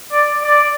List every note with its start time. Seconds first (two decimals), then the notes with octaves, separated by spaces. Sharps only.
0.12 D5
0.44 D5